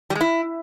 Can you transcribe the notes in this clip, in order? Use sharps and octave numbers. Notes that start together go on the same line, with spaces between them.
G3
G#3
E4